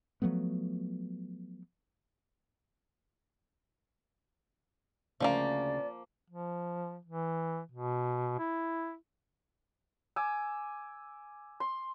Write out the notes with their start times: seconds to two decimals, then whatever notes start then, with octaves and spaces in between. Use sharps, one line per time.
0.22 F3 F#3 A3 B3
5.20 D2 C#3 F3 G#3 A#3 D5
6.30 F3
7.05 E3
7.71 B2
8.39 E4
10.16 G#5 D6 E6
11.60 C6